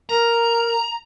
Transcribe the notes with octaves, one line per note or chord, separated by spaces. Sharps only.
A#4 A#5